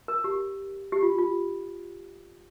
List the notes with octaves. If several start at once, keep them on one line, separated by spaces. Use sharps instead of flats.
A#4
G4
G4
F4
F4